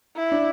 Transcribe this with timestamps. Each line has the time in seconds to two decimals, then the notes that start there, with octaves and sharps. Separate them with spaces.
0.16 E4
0.32 D4